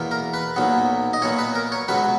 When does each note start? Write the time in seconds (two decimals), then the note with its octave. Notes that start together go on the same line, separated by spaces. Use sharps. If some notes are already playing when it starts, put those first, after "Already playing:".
Already playing: E2 B2 A#3
0.11 A#4
0.34 B4
0.56 B1 A#2 F#3 B3
1.13 D#5
1.22 A#2 F#3 B3 C#5
1.38 B4
1.55 A#4
1.72 C#5
1.88 C#2 B2 F#3 B4